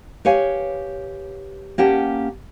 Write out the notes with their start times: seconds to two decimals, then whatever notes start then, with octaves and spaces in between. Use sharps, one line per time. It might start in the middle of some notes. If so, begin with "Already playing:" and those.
0.25 G4 B4 C#5 F5 G#5
1.78 A#3 C#4 G4 F#5 G5 A5